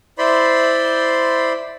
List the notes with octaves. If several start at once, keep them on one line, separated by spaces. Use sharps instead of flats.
E4 C5 D5 B5 C6